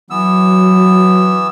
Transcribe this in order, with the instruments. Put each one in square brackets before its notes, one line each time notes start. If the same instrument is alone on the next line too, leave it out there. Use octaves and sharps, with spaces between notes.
[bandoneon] E3 B3 E6 [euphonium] F#3